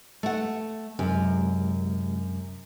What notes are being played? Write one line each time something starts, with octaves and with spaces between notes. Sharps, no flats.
A3 F#5
F#2 C3 G#3